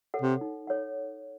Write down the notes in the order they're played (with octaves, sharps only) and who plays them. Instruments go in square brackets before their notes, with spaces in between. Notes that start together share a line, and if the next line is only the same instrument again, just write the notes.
[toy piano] A4 C#5 F#5
[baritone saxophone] C3
[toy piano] D#4
A4 C#5 F#5